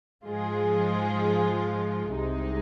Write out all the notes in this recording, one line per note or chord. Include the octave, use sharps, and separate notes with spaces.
G#2 F3 G#3 F4 G#4
C2 C3 G#3 D#4